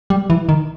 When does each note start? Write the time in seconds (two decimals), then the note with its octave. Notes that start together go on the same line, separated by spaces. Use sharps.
0.10 G3
0.30 E3
0.49 D#3